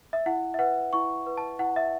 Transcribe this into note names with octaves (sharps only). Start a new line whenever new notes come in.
E5
E4 F#5
E5
B4 F#5
E4 C#6
B4
A5
E4 F#5
E5